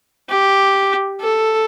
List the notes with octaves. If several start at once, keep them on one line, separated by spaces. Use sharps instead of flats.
G4
A4